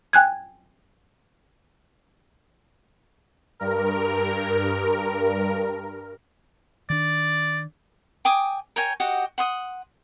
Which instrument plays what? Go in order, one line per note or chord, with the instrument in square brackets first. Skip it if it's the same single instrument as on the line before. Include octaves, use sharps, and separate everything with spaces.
[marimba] G5 G#5 F#6 G#6
[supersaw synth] G2 A#4
[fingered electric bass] D#3 D4 [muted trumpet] D5
[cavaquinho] G5 G#5 D6 D#6
A#4 C#5 G5 G#5
F#4 G4 D#5 F#5
F#5 C6 D#6